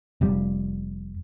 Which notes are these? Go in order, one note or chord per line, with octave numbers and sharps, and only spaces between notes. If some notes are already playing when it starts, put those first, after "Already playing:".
F1 F2 G3